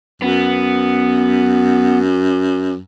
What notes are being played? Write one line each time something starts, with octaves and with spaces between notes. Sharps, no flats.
F#2 B3